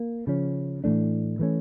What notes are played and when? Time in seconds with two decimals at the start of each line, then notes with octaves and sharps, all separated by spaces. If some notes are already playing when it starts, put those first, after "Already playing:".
Already playing: A#3
0.27 C#3 F3 C#4
0.84 A2 E3 A3 D4
1.39 E3 A3 C#4